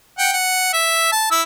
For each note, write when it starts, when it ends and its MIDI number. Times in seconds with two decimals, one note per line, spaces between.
0.18 0.33 78
0.18 0.33 79
0.33 0.72 78
0.73 1.07 76
1.12 1.28 81
1.31 1.42 64
1.31 1.42 88